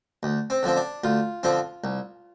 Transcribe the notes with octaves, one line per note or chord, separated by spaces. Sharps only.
D2
C4
D3 F3 C4
D4
D2 F4
D3 F3 C4
C2